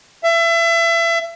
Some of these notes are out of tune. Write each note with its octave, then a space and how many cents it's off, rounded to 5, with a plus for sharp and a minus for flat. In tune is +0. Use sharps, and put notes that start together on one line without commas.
E5 +30